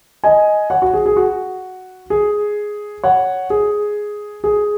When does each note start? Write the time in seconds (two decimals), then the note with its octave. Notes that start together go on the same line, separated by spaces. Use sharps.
0.24 D#5 G#5
0.70 C#5 F#5
0.82 F#4
0.94 G#4
1.06 G#4
1.17 F#4
2.10 G#4
3.04 C#5 F#5
3.50 G#4
4.44 G#4